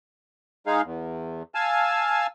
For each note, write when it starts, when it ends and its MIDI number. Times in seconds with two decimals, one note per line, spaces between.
0.67 0.82 56
0.67 0.82 63
0.67 0.82 68
0.67 0.82 77
0.84 1.43 40
1.55 2.27 77
1.55 2.27 80
1.55 2.27 81
1.55 2.27 88